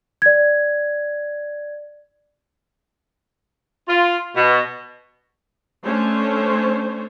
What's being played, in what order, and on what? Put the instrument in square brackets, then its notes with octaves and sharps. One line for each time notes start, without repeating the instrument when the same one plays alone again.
[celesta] D5 G#6
[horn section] F4
B2
[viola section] A3 C#4 D4 C5 C#5